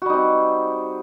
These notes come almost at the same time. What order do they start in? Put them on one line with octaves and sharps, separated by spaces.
F#4 G3 D#4 C4